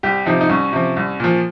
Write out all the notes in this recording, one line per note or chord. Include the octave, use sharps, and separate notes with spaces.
C2 G4
C3 F3 D#4
D#4
C2 C#4
C3 F3
C2
A#2 F3